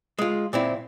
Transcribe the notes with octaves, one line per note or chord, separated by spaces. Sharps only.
G#3 F4
A#2 C4 E4